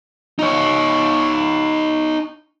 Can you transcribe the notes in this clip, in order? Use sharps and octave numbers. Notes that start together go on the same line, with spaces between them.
D#4 C#5